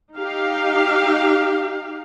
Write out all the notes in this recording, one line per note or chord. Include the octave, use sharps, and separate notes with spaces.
D#4 G4 F5